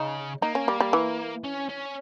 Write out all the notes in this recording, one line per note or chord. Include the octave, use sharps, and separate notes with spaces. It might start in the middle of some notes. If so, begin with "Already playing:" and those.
Already playing: C#3 D#4
A#3 D#4
C#4
G3
G3
E3
C#4
C#4